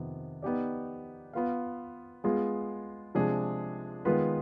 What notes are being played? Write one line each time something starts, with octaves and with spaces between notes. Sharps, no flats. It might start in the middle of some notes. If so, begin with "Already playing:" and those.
Already playing: F2 C3 D#3 B3
B3 D#4 G4 D5
B3 F4 B4 F5
G#3 B3 F4 G#4
C3 F3 G#3 D4 G#4
D#3 G#3 B3 F4 B4